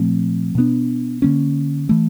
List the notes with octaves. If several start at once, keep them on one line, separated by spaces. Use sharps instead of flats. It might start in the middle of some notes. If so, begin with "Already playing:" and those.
Already playing: A#2 F3 A3 C4
B2 G3 B3 D4
D3 F3 A#3 C#4
E3 A3